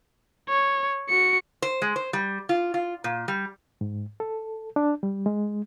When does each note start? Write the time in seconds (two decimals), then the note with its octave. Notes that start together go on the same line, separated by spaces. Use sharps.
0.49 C#5
1.09 F#4 C#7
1.62 C5
1.82 G#3
1.96 C5
2.13 G3
2.49 F4
2.74 F4
3.04 A#2
3.28 G3
3.81 G#2
4.20 A4
4.76 D4
5.03 G3
5.26 G#3